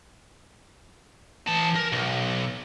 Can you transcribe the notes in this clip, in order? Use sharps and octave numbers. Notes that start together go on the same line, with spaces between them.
E3 A5
A#4
B1